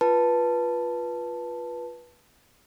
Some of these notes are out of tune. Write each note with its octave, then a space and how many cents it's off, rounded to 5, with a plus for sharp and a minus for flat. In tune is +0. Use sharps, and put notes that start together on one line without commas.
F4 +0 B4 -15 A5 +0